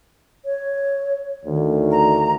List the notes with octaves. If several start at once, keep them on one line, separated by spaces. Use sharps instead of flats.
C#5
D2 D#3
A#5